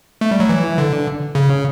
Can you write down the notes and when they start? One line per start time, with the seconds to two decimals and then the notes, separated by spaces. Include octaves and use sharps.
0.21 A3
0.31 G3
0.40 F#3
0.49 E3
0.78 D3
1.35 C#3